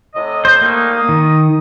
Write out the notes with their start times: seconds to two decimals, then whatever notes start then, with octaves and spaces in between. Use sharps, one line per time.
0.15 A2 C3 D#5
0.45 C5
0.61 G3 A3 A#3 D#4
0.92 D#6
1.09 D#3